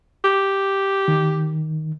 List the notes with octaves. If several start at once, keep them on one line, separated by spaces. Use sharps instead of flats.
G4
D#3